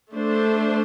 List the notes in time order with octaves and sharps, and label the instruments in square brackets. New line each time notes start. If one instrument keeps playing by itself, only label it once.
[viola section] A3 D4 A4 C5